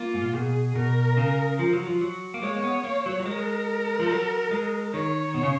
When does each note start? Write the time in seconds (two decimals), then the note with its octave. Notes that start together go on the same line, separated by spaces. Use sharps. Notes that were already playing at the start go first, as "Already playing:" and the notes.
Already playing: A#3 F4
0.14 G#2
0.24 A#2
0.34 B2 G#4
0.75 B2 A#4
1.17 C#3
1.59 F3
1.73 F#3
1.87 F3
2.01 F#3
2.34 A#3
2.42 G#3 C#5
2.56 A#3
2.64 B3
2.84 A#3
3.06 F#3
3.20 F#3
3.26 G#3 A#4
3.99 F3
4.10 F#3
4.51 G#3
4.93 D#3 C#5
5.34 B2
5.43 C#3